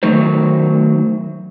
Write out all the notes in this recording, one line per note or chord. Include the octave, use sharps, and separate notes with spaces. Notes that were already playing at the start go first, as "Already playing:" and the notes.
D#3 F#3 A3 D#4 C5